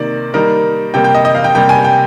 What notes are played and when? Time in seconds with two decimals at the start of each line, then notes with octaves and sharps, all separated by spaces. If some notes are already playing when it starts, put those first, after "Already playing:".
Already playing: C3 D#3 A#3 D5
0.34 D#3 G3 A#3 D#4 A#4
0.94 C3 G3 A#3 G5
1.04 G5
1.15 D#5
1.25 D#5
1.35 F5
1.44 G5
1.55 C3 G3 A#3 G5
1.69 G#5
1.84 G5